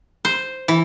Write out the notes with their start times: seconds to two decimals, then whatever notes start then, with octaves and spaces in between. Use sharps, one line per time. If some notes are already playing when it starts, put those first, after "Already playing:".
0.25 C5
0.68 E3